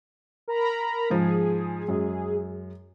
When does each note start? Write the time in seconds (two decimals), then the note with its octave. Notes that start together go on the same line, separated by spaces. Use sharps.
0.48 A#4 A#5 B5
1.10 G#2 F3 G#4
1.88 F#2 G#3